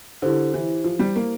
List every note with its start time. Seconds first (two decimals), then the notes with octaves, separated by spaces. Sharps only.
0.22 D3 E4 G4 C5
0.54 E3
0.84 F3
0.99 G3
1.16 A#3